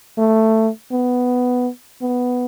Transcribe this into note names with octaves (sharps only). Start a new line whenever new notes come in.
A3
B3
B3